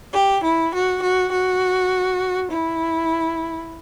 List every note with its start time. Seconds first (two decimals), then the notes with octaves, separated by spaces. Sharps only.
0.13 G4
0.43 E4
0.73 F#4
1.02 F#4
1.32 F#4
2.51 E4